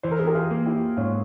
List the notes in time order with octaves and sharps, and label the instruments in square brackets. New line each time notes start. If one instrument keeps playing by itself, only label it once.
[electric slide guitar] E3 [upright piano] C5
[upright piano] A#4
G#4
G4 A#4
F4 G#4
[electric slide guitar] A#3
[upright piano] E4 G4
[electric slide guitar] G#2 [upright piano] C#4 F4